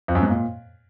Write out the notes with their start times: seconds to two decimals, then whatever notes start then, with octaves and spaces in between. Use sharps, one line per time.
0.08 F2
0.15 F#2
0.23 G#2
0.30 A#2